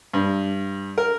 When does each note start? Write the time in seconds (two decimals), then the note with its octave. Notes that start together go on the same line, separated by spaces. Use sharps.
0.14 G2
0.98 A#4